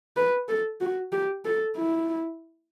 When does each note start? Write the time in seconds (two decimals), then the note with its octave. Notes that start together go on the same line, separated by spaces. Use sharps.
0.17 B4
0.48 A4
0.80 F#4
1.12 G4
1.45 A4
1.77 E4